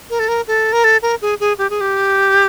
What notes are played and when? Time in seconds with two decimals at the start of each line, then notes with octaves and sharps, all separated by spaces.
0.10 A#4
0.19 A4
0.28 A#4
0.47 A4
0.73 A#4
0.84 A4
1.02 A#4
1.22 G#4
1.40 G#4
1.58 G4
1.70 G#4
1.81 G4